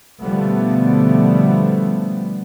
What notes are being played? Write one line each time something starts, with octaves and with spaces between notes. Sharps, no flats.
B2 D3 F3 G3 A3 B3